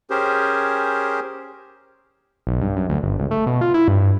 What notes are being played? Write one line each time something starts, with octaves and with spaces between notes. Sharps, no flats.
C#4 G4 G#4 A#4 C5
B1
G2
F#2
D2
G1
C#2
A3
B2
F4
E4
G2
G2